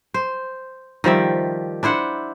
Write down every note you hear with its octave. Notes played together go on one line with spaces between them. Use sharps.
C5
D#3 F3 G3 E5
D4 E4 C5 F#5